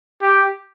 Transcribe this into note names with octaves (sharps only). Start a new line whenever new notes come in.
G4